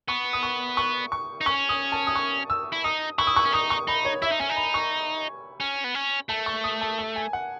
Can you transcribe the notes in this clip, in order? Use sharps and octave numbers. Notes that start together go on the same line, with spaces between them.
B3 C#6
D#6
C#6
C#6
C#6
D#4
C#4 C#6
D#6
A5
D#6
C#6
E6
E4
D#4 D#6
E4 C#6
D#6
C#6
C#4
D#4 D#6
C#6
D#4 B5
C#5
E4 E5
D#4
C#4 G#5
D#4
B5
C#6
C#4
B3
C#4
A3 A5
C#6
D#6
A5
A5
G#5
F#5